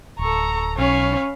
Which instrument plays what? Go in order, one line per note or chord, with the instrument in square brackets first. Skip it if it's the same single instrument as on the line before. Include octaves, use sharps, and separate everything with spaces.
[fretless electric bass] D1 [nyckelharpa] A4 C#6 [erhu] A#5
[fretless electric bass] B1 [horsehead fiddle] C#4 [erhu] C#5 [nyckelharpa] F5 B5